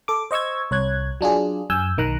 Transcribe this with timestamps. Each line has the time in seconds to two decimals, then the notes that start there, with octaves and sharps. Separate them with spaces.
0.08 A4 D6
0.31 C5 D#5 C#6 E6 G#6
0.71 C2 C#5 F#6 G#6
1.21 F#3 D4 F4 G#4
1.70 F#2 G#5 E6 G6
1.98 B1 D#3 A#5 F#6